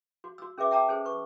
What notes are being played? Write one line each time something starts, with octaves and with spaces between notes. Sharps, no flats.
F#4
F#4 E6
C#4 G#4 B4 E5 D6
E5 G5 A5 A#5 D6
C#4 G#4 A4 C5
B4 C#6